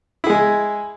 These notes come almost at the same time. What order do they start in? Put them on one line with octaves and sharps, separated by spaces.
E4 G#4 G#3